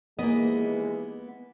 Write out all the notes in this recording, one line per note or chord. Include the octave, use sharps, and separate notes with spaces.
D#2 E3 G#3 A#3 B3 D#5